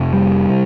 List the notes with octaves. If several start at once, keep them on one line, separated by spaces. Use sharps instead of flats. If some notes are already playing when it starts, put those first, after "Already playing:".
Already playing: F1 F2 C3
G3
C3